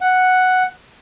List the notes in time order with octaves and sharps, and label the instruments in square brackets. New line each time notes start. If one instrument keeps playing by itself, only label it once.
[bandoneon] F#5